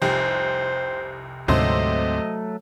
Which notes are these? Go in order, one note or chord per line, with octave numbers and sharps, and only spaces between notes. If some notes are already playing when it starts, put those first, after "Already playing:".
F1 C2 G4 C5
D2 G#2 C3 F#3 A3 C5 D#5